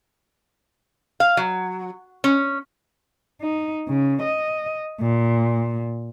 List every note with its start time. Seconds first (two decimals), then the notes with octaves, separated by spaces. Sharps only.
1.20 F5
1.37 F#3
2.24 C#4
3.41 D#4
3.88 C#3
4.22 D#5
5.01 A#2